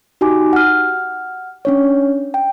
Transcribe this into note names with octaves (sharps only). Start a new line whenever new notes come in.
D#4 F#4 G4 G#5 D6
F#5 F6
C#4 D4 C#5
G5